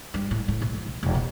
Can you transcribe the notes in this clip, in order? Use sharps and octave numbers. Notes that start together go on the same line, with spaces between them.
G2
A2
A2
B1
F3
B1
E1
B2